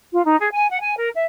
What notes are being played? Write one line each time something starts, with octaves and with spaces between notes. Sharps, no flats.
F4
D#4
G#4
G#5
F#5
G#5
A#4
E5